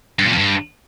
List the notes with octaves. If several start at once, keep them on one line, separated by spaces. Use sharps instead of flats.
G2
A#2
F2
G2